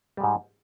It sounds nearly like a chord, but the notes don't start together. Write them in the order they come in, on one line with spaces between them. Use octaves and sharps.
G3 G#3 G#2